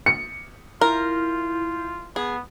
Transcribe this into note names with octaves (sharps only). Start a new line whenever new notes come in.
C#7
E4 F4 A#4 G6
B3 G#4